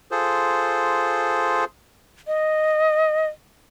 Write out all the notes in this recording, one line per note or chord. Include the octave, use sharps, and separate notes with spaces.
F4 G#4 A4 C5
D#5